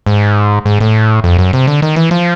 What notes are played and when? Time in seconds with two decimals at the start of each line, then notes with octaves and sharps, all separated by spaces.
0.06 G#2
0.66 G#2
0.80 A2
1.24 F2
1.39 F#2
1.53 C3
1.67 D3
1.82 D#3
1.96 E3
2.11 F3